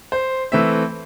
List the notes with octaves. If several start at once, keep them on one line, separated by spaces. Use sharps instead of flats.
C5
E3 A3 C4 E5